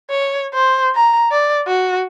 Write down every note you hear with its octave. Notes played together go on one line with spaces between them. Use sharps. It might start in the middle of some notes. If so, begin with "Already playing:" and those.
C#5
C5
A#5
D5
F#4